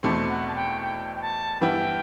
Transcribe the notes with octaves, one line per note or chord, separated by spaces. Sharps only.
E2 B2 A3 C4
F#5
A5
G5
G5
G5
A5
G2 E3 B3 E4 G5